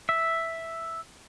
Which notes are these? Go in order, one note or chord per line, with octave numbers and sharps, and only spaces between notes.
E5